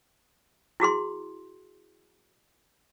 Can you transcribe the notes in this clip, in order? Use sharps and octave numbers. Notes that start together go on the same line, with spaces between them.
E4 F#4 G#4 C6